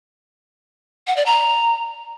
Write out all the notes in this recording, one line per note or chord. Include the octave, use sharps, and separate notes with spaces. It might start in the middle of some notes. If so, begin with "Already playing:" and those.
F#5
D5
A#5